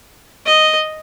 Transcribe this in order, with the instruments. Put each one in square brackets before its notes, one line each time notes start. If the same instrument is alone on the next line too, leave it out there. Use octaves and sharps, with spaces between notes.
[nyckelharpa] D#5